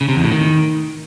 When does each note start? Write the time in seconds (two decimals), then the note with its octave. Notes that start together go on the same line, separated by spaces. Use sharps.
0.01 C#3
0.08 C3
0.16 E2
0.24 A2
0.32 D#3